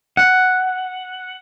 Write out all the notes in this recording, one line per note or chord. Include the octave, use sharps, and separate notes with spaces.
F#5